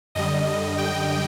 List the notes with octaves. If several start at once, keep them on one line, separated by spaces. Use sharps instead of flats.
F#2 D3 G3 D#5
D#5
G5